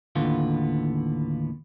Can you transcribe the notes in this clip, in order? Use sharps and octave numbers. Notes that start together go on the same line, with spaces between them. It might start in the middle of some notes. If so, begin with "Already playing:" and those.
D#2 A2 D3 B3 F4